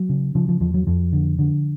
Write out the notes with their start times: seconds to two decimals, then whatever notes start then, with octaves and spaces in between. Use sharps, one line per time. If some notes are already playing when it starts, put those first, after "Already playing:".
Already playing: F#3
0.09 C#3
0.35 C#3 F3
0.49 F3
0.61 E2 F3
0.74 F#3
0.87 F2 F3
1.13 D3
1.39 D3